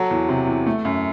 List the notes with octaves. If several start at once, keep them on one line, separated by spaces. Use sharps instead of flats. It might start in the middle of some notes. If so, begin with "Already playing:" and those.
Already playing: F#3 A4
E2
C3
E2
A3
F#2